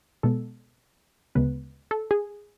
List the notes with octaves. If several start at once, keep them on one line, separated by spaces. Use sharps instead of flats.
B2 G#3 B3 A4
D2 C#3 G#3 B3 B4
A4
G#4